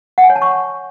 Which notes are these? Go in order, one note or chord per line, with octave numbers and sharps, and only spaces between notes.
F#5
G#5
C#5
A5
C#6